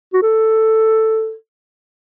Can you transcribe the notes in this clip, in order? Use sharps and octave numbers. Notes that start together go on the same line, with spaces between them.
F#4
A4